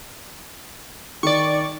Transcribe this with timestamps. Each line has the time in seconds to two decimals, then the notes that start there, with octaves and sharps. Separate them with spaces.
1.23 D#3 D5 C#6